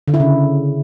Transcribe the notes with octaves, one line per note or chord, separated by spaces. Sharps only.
D3
E4
C#3